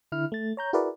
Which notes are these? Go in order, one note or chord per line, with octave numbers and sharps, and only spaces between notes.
D3 E4 F6
A3 A6
C#5 A#5 G6
E4 F#4 G#4 A#4 B4 D5